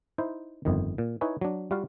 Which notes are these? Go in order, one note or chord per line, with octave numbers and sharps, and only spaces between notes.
D#4 E4 C5
G1 F2 D#3
A#2
D#4 E4 B4 C#5 G#5
F#3 D4
G3 F4 F#4 F5